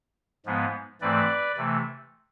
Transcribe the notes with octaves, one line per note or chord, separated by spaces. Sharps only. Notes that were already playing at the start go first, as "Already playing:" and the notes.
G#2 F3 G#3 B3
G#2 E3 A3 C4 B4 D5
C3 E3 A3